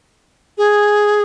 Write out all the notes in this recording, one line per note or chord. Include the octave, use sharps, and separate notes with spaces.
G#4